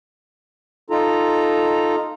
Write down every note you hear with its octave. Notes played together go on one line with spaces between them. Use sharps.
D#4 F4 A4 A#5